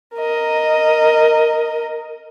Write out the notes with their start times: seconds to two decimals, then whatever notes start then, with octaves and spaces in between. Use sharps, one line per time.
0.16 A#4 D#5